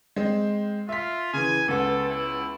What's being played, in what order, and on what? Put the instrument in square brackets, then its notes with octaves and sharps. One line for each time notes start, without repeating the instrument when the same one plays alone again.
[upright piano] G#3 C4
[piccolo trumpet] F4 [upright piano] E5 B6
[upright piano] C#3 E3 [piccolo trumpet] G#5
[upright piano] C#2 B3 [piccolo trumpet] A4
[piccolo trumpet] E4